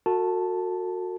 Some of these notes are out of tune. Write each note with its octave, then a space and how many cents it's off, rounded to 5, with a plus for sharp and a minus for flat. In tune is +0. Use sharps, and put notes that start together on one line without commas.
F#4 -20 A4 +45 A5 +0